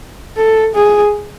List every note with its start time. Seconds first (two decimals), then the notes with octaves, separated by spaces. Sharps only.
0.38 A4
0.75 G#4